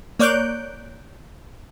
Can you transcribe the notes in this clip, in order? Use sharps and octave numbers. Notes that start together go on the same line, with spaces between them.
A#3 C#5 D5 F#6 G6 D7